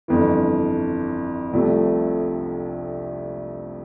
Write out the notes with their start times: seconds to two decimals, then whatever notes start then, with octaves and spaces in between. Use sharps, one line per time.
0.08 G1 F2 E3
1.53 C2 C3 F3 A3